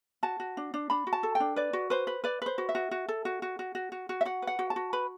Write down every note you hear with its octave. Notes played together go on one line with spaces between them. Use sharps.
F#4 A5
F#4
D4
D4
D4 B5
F#4
A5
A4
G5
D4
B4 D5
F#4
B4 C5
B4
B4 D5
B4 C5
F#4
E5
F#4
F#4
A4
F#4
F#4
F#4
F#4
F#4
F#4
E5
F#4 F#5
B4
F#5
F#4
A5
F#4
B4 B5